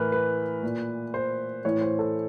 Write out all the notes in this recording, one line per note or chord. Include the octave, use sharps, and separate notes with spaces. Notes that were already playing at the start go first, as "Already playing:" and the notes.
Already playing: A2 E3 A#4 B4
B4
A#2
C5
A2 E3 C#5
C5
A4